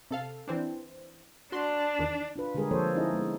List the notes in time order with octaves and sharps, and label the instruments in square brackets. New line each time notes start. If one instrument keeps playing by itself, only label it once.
[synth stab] C3 A4 F5
E3 C4 D4
[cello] D4 [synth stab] F#4 C6
[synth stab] E2 D#3
[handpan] D4 F4 B4
D3 G3 G#3 G4 G#4 A#4
F3 A#3 A4 C5 C#5
C#4 D#4 E4 G#4 D#5
G#3 B3